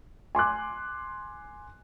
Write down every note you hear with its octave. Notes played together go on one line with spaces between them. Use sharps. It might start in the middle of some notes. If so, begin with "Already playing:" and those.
G#5 C6 D6 F#6